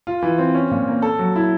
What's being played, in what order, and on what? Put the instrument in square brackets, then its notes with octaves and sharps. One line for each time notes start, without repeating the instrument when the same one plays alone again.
[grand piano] F4
E3
C4
C#4
A#2
A#3
A4
F#3
E4